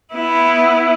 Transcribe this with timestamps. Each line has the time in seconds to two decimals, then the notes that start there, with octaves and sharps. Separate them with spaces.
0.13 B3 E4